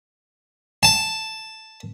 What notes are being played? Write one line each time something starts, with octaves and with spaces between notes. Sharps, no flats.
A5